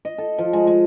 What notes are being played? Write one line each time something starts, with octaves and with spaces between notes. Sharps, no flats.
D#5
A4
F3
G#3
G#3